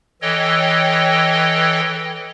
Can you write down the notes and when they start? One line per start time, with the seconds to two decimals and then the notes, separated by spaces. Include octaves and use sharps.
0.22 E3 A4 C#5 D#5 G5